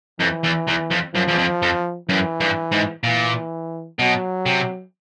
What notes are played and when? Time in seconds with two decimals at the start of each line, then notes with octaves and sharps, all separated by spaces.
0.20 F2 E3
0.43 E2
0.67 E2
0.91 F2
1.14 F#2 F3
1.28 E2
1.38 F2
1.62 F2
2.09 F#2 E3
2.41 G2
2.72 G#2
3.04 A#2 E3
3.99 B2 F#3
4.46 C3